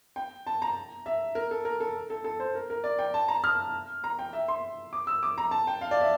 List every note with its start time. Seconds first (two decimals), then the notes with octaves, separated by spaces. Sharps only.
0.16 G5
0.47 A5
0.62 A#5
1.06 E5
1.35 A#4
1.51 A4
1.65 A#4
1.80 A4
2.10 A4
2.24 A4
2.40 C5
2.55 A#4
2.70 A#4
2.84 D5
2.99 G5
3.14 A5
3.28 A#5
3.44 F6
4.04 A#5
4.19 G5
4.33 E5
4.48 C6
4.93 D6
5.07 E6
5.23 D6
5.38 A#5
5.51 A5
5.67 G5
5.81 F5
5.91 D5
6.01 E5